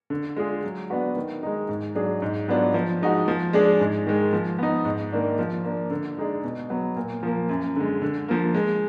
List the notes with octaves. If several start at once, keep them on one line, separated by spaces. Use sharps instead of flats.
D3
G#3 D4 F4 G#4
F#3
B3 D4 F#4 B4
D#3
G#3 D#4
G#2
F#3 D4 G#4
G#2
F#3 B3 D4 F4
F3
G#3 D#4 F#4
F3
G#3 D4 G#4
G#2
D#3 G#3
F3
B3 D#4
G#2
D#3 A#3 D4
F3
A#3 D4
D3
G#3 D#4 G#4 D5
B2
F#3 B3
A#2
F3 A#3
F#2
D3 G#3
D3
F3 A#3
G#3